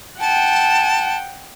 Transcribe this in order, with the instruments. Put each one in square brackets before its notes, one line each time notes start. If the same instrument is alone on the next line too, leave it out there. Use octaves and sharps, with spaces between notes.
[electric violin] F#5 G5 [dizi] A5